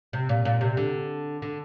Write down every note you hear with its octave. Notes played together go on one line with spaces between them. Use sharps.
C3
A#2
A#2
C3
D3
D3